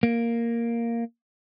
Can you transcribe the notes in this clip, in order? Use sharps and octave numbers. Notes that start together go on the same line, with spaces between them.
A#3